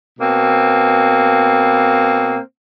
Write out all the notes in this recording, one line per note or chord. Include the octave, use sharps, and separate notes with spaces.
B2 A#3 C4